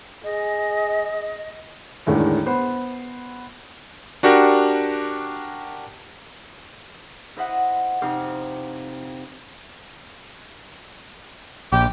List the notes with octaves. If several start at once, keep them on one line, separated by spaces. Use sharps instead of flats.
G#4 D#5
E2 A2 D3 D#3 G#3
B3 C5
D4 F#4 G4 A#4
E4 C5 D#5 E5 F#5
F2 C3 D#4 C5 D6 F6
A#1 G5 D6